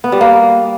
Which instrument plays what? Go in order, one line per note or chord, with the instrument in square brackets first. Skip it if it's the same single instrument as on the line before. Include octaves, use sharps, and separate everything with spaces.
[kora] B3
G3
A#3